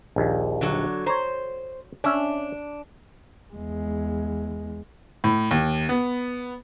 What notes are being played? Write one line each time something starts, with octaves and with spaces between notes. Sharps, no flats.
A#1 D#2
D3 F#3
C5 C#5 A#5
C#4 D4 E5
E2 G#3
A2
D#2
B3